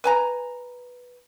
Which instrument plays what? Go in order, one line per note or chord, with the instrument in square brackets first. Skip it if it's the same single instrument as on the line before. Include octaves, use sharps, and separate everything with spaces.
[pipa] B4 G#5 A#5